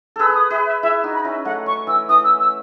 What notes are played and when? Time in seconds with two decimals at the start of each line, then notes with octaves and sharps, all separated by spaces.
0.16 G#4 A4 B4 E6
0.35 D#6
0.50 G#4 B4 E5
0.67 E5
0.82 E4 G#4 E5
1.04 D#4 F#4
1.14 B5
1.25 C#4 E4
1.30 E5
1.45 F#3 A3 F#5
1.66 F#3 C#6
1.87 E3 E6
2.09 E3 D#6
2.24 E6
2.40 E6